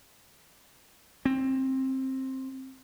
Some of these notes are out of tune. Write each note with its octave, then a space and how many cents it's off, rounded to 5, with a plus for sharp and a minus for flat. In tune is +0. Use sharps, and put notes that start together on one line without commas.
C4 +15